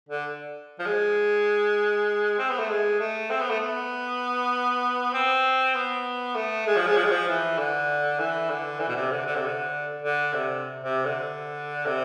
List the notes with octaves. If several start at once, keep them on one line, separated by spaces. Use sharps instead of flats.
D3
F3
G#3
C4
B3
A3
G#3
A3
C4
B3
A3
B3
C4
B3
A3
G#3
F3
G#3
F3
G#3
F3
E3
D3
E3
D3
E3
B2
C3
D3
D3
C3
D3
D3
C3
C3
D3
C3